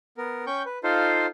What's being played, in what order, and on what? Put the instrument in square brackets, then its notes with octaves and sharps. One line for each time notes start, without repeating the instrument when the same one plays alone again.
[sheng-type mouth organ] B3 A#4
C#4 G5 C#6 G6
B4
D#4 F4 A4 C5 F5